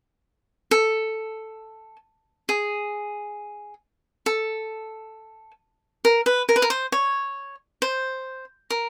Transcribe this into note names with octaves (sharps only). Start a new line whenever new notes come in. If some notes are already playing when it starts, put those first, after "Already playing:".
A4
G#4
A4
A#4
B4
A#4
B4
A#4
C5
C#5
C5
A#4